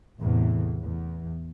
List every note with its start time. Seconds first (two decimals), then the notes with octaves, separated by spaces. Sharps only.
0.19 A1 E2 A2 C3 E3
0.82 E2